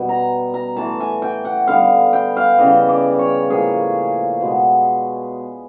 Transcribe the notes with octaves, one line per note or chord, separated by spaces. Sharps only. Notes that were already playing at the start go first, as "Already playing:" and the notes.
Already playing: B2 G3 B3
A#5
A#5
A2 E3 A3 A5
G#5
G5
F#5
D3 G3 B3 F5
G5
F5
C#3 E3 G3 D#5
D5
C#5
A2 F3 A#3 G#4
B2 G#3 B3